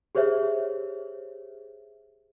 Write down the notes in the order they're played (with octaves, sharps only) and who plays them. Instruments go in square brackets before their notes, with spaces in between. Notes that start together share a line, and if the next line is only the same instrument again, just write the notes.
[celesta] G4 G#4 C5 C#5 E5